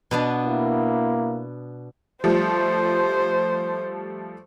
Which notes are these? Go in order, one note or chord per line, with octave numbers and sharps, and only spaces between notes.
B2 B3 D4
A#3 E4
F3 G3 A3 C5